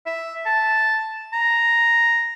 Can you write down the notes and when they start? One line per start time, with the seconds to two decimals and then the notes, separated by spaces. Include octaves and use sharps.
0.06 E5
0.46 A5
1.33 A#5